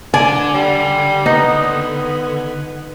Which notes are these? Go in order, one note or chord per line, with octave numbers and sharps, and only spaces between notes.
D3 D5 G#5
G3
B3 D#4